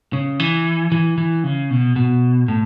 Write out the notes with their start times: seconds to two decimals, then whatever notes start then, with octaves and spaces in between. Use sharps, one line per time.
0.13 C#3
0.40 E3
0.92 E3
1.18 E3
1.44 C#3
1.70 B2
1.96 B2
2.48 A2